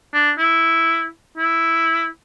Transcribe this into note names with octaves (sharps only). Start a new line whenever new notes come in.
D4
E4
E4